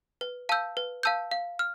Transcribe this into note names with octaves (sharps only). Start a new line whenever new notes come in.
B4
F5 A5 E6 G6
B4
F5 A5 E6 G6
F5
F6